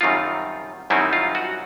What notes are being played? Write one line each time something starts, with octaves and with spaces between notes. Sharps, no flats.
F#2 D#3 G3 C4 D#4 F4
F#2 D#3 G3 C4 D#4 E4
F4
F#4